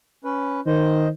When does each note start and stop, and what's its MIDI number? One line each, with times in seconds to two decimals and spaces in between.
0.24 0.60 61
0.24 0.60 71
0.67 1.10 51
0.67 1.08 72
0.67 1.08 75